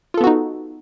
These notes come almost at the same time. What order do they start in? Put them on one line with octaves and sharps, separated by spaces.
F4 A4 B3 F#4 D#4